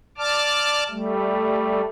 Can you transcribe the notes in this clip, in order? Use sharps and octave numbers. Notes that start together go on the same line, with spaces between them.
D5 A5 D6 F6
G3 A3